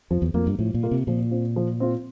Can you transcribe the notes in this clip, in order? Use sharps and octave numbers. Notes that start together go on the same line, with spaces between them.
F2 F3
E2
F2 A#3 F4
G2
A2 F3
A#2
A#3 F4
C3
A#2 F3
C4 F4
F3
C4 F4